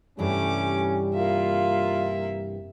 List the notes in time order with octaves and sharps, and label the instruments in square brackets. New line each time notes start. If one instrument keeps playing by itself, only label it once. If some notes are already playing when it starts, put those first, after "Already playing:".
[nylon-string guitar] G2 C3 E3 [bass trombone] G3 [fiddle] A3 D6 [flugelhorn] C#4
[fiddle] A#3 E5 [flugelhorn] F4